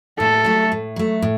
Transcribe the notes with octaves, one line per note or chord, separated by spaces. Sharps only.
A2 A4
F#3 A3
A2
F#3 A3
A2